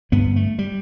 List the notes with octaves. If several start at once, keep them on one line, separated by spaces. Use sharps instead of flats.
G2 D3 B3
A3
G3